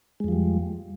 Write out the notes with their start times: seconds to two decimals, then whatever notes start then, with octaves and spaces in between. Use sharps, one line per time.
0.20 G#3
0.24 F2
0.28 F3
0.32 G3